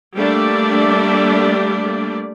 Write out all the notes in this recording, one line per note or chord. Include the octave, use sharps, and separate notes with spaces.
G3 A3 A#3 D4 D5